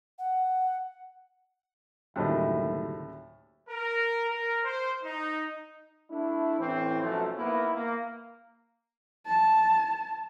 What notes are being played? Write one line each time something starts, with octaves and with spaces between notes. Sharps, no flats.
F#5
F#1 D2 A2 D#3 G3 A3 D#5
A#4
A#4
C5
D#4
A3 D4 E4
A1 A2 E3 C4
B1 F#2 F3 A3
G#2 A#3 B3 E4
A#3
A5